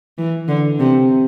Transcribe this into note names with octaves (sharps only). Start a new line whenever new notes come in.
E3
D3
C3